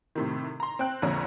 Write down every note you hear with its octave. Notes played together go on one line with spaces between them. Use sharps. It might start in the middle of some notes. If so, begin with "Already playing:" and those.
A2 C3 D#3
A#5 C6
C4 G5 F#6
A#1 F2 A#2 D3 C#5 A#5